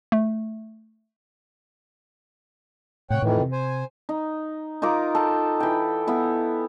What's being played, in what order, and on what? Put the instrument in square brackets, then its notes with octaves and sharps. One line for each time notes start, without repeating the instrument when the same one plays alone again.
[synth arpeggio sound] A3
[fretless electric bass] A2 C3 [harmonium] C#5 F#5 G5
[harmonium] F2 D#3 E3 [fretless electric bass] A2
[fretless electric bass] C3
[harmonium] C5 G#5
[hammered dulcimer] D#4
D#4 F4 A#4 D6
A4 G5
E3 G5
B3 E4